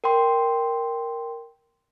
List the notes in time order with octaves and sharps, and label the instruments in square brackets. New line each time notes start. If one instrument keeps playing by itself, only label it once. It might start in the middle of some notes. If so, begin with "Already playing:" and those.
[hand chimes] A#4 G5 C6